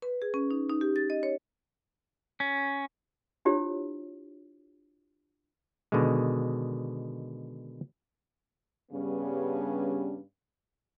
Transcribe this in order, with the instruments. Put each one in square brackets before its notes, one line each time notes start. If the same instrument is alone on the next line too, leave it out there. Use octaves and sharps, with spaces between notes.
[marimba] B4
G#4
C#4
D#4
D#4
G4
A6
D#5
C#5
[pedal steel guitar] C#4
[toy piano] D4 E4 F4 G4 C5 C#5
[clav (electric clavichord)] B2 D3 D#3 G#3
[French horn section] G2 C#3 G3 B3 C#4 D4